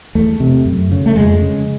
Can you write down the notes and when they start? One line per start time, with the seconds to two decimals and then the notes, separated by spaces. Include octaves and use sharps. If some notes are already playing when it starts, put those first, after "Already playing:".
0.15 E2 A3
0.40 C3
0.65 F#2
0.92 C#3
1.06 A3
1.16 F2 G#3
1.42 C#3